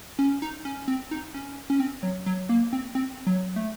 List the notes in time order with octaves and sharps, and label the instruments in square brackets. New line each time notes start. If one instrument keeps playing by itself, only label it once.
[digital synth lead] C#4
D#4
C#4
C4
D#4
C#4
C#4
C4
F#3
F#3
A#3
C4
C4
F#3
A3